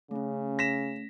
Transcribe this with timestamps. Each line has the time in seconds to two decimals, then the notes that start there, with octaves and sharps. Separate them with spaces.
0.11 C#3 A3 C#4
0.59 A#6 B6 E7